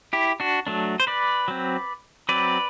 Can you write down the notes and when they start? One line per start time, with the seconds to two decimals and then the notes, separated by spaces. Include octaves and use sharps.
0.13 E4 G4
0.40 D4 F#4
0.67 F#3 A3 D4
1.00 C5
1.07 B4 D5
1.48 F#3 C4
2.29 F#3 C4 B4 D5